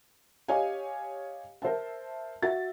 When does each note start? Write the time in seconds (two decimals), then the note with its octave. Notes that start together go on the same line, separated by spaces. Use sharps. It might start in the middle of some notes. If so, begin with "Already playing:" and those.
0.48 G4 C#5 D#5 F5 G#5
1.62 A#4 C5 E5 A5
2.43 F#4 E5 A6